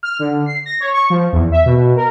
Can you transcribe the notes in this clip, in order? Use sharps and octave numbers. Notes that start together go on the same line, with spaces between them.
F6
D3
C7
A#6
C#5
C#6
F3
E2
E5
B2
B2
A#4